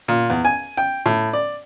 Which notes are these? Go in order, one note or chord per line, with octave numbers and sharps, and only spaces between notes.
A#2
E2
G#5
G5
A2
D5